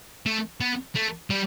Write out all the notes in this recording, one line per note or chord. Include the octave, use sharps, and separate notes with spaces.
A3
B3
A3
G3